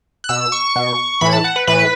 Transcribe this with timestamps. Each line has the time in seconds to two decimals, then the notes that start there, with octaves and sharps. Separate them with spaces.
0.24 F#6
0.29 B2 E6
0.52 C#6
0.76 B2
1.21 A2 E3 B5
1.33 A5
1.44 F#5
1.56 B4
1.67 A2 E3 B4